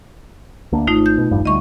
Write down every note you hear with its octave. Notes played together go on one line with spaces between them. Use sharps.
D2 A#3 D4
G#1 A3 D#4 F4
G6
B2
E1 A1 G2
D2 G3 D#5 C#6